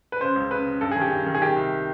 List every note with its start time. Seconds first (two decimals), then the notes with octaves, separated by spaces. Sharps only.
0.12 B4
0.21 C#3 C5
0.36 C#2
0.51 C#3 B4
0.66 C#3
0.81 G2 A4
0.91 D#3 G#4
1.01 G4
1.12 G2
1.26 D#3
1.35 G#4
1.42 D#3 G4
1.56 C2